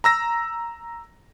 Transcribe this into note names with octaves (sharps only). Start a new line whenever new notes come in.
A#5 E6 A#6